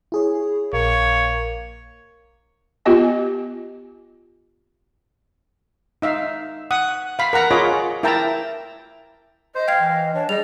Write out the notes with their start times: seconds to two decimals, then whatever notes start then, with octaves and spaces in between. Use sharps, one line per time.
0.12 E4 G#4 C#5
0.73 A#1 A#3 C#5
2.85 B3 F4 G4 D#5 G#5
6.02 D#4 E5 F5
6.71 F#5 D#6
7.19 F5 B5
7.33 A#4 F#5 A#5 B5
7.51 F4 G#4 C#5 D#5 B5 D6
8.03 E4 A#4 E5 G5 A5 A#5
9.55 C5 D#5
9.68 F5 G5 G#6 C7
9.81 E3
10.14 D4 C#5
10.29 G3 G#4 D#5 F7